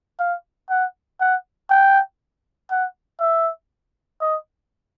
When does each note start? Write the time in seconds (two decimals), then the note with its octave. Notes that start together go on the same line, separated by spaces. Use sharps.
0.20 F5
0.70 F#5
1.21 F#5
1.70 G5
2.71 F#5
3.20 E5
4.21 D#5